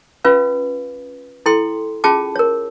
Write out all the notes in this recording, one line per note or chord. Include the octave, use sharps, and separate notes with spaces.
C#4 F4 B4 F5
E4 A4 G5 C6
C#4 F4 G#4 G5 A5 D6
A#4 C#5